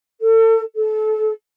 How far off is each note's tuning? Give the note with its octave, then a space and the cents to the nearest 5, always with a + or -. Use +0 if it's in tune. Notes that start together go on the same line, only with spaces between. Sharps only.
A4 +35
A4 -30